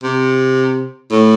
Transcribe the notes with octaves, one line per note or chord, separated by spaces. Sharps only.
C3
A2